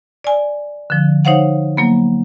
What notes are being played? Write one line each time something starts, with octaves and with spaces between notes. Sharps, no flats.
D5 G#5
D3 F3
D#4 C5 C#5 F5 F#5
F#3 A#3 B3